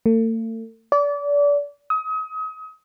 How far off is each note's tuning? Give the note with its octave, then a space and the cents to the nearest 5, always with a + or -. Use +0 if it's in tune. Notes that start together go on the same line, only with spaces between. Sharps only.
A3 +40
D5 -30
D#6 +35